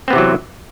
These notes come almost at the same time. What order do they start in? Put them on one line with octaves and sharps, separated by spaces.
C4 B3 C3 E3 F#3